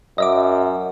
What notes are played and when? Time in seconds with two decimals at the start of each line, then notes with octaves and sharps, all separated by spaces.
0.18 F#2 D#5 E5 D6